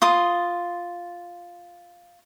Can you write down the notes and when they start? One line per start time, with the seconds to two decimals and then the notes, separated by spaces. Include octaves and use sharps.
0.02 F4 C6 D#6